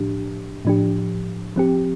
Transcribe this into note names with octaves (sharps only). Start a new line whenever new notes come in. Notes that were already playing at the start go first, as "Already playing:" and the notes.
Already playing: A2 F3 D4 G4
A2 F3 D4 G4
F3 C4 G4